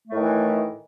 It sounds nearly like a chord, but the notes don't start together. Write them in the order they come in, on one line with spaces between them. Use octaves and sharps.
A3 A2 D#3 E3